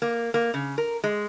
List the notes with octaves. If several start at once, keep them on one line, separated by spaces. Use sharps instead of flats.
A#3
A#3
C#3
A#4
G#3